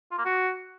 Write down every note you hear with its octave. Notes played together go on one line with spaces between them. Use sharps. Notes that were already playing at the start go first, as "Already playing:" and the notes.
F4
A#3
F#4